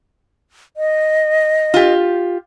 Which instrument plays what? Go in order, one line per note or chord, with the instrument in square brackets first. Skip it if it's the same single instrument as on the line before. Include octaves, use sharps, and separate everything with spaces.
[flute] D#5
[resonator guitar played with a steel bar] F4 G4